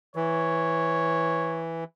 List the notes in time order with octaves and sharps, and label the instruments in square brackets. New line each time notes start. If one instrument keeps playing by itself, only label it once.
[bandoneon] E3 [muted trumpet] C#5